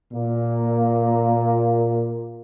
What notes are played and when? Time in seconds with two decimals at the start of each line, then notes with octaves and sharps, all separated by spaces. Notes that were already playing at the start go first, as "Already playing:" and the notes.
0.13 A#2 A#3